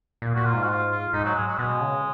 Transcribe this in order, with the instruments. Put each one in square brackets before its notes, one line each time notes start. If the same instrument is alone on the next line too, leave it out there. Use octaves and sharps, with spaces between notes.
[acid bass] A#2
[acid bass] A#2 [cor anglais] F#4
[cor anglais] F4
[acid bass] G#2
[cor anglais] F#4
F4
F4
[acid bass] G#2 [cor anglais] D#4
[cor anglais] F#3
G#3
F#3
[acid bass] B2 [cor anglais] G#3
[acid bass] C#3